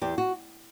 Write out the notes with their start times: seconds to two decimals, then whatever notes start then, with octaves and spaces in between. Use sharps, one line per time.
0.01 E2 G4
0.18 F#4